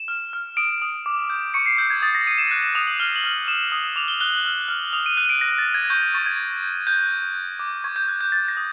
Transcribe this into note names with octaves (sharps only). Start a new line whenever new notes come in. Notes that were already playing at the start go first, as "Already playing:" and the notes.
Already playing: E7
F6
F6
D#6 D7
D#6
D6
G6
C#6 C#7
C7
E6 G6
G#6
D#6 A6
A#6
D#6 D#7
E7
F#6
E7
D#6 F7
F#7
F6 G7
F#7
F6
D#6 E7
D#6
D6 F7
G7
F#6 G7
F#7
F6
F6
D#6 F7
D#7
F#6 D#7
D7
F#6 A#6
A6
F#6
G#6
C#6 G6
G#6
C#6 A6
G#6
G6
G6
F#6 G6
F#6
F#6
D6
C#6 G#6
G6
F#6 G#6
G6
G6 A6
A#6
D#6